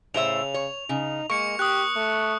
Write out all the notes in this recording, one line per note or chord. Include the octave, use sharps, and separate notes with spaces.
A2 C#3 C5 E5 F7
C#5
C#3 D#4
G#3 A#3 C#6 C#7
G4 D#6 F#6
A3